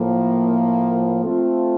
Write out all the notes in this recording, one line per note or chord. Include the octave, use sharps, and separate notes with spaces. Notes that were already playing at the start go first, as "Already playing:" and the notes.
Already playing: A2 F3 A#3
A3 C4 F4 A4